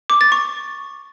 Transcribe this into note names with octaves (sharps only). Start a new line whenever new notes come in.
D6
A6
C#6